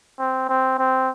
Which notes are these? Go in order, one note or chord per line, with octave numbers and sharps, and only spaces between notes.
C4
C4
C4